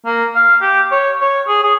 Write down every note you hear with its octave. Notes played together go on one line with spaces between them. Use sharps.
A#3
F5
G4
C#5
C#5
G#4
G#4